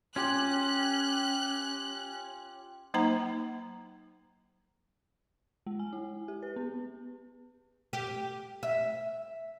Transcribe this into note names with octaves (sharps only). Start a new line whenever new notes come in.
C#4 F4 G4 F#6
F#3 A#3 D#4 C5 G5 A#5
G#3
G#5
E4
G4
B4
B3
G4
E5